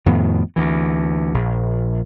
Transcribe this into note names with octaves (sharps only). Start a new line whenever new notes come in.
F2 A2 D#3 B3
D2 E3
A#1